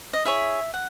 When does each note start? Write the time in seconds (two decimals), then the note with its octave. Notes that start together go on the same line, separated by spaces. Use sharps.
0.13 D#5
0.25 E4 G#4 C#5 E5
0.74 F#5